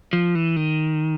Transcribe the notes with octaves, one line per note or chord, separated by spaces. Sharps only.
F3
E3
D#3